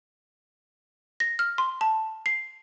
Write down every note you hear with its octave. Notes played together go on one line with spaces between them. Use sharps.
A#6
F6
C6
A5
C7